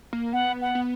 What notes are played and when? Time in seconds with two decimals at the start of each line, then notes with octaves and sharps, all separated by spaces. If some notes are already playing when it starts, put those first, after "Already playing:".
0.13 A#3
0.33 B3 F#5
0.61 F#5
0.75 B3